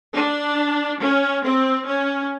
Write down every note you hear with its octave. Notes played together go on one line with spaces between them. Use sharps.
D4
C#4
C4
C#4